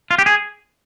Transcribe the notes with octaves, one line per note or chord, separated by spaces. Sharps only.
F4
G4
G#4